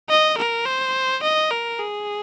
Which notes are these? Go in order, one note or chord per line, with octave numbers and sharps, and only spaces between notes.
D#5
A#4
C5
D#5
A#4
G#4